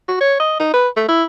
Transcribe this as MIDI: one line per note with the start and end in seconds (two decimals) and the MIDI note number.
0.08 0.16 66
0.21 0.37 73
0.40 0.58 75
0.59 0.73 63
0.73 0.88 71
0.97 1.04 57
1.08 1.24 64